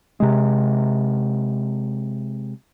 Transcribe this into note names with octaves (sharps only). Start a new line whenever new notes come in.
C3 G#3